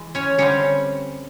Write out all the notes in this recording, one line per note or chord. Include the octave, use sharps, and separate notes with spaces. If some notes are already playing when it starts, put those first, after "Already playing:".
Already playing: E3 G#3
C#4 C#5
D3 G3 C4 C#4 C#5